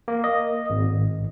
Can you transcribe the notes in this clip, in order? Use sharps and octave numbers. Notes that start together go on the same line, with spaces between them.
A#3
D#5
G#1